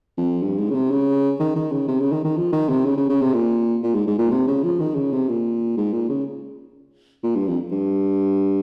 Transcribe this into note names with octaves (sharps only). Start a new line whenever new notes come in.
F2
G2
G#2
C#3
C3
C#3
D#3
D#3
C#3
C3
C#3
D#3
D#3
F3
D#3
C3
C#3
C#3
C#3
C3
A#2
A#2
G#2
G#2
A#2
C3
C#3
F3
D#3
C#3
C3
A#2
G#2
A#2
C#3
A#2
G2
F2
G2